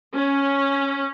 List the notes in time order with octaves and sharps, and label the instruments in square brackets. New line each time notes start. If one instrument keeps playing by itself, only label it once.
[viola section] C#4